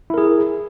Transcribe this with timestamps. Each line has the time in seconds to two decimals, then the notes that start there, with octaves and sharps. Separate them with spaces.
0.10 E4
0.14 A#4
0.18 G#4